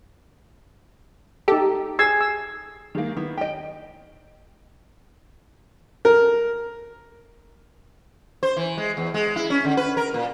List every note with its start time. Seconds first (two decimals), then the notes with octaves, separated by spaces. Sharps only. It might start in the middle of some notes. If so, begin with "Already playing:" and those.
1.48 D#4 G4 A4
1.99 G#4 E6 G#6 C7
2.21 E6
2.95 D#3 G#3 A#3
3.17 D#3 B3 E4
3.37 G4 D#5 G5 D7
6.05 A#4
8.43 C5
8.57 E3
8.77 G#3
8.97 E2
9.14 G#3
9.36 E4
9.50 C#4
9.65 D3
9.77 B4
9.97 A#4
10.14 A#2